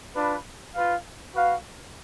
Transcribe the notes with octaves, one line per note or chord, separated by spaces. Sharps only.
D4 F4 B4
F4 B4 F5
F#4 B4 F5